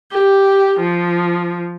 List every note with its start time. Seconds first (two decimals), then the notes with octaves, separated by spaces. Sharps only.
0.11 G4
0.80 F3